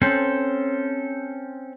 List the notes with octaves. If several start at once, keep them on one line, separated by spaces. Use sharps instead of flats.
C4 C#4 A4 C5